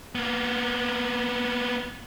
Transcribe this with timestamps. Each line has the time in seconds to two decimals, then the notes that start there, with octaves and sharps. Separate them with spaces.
0.15 A#3 B3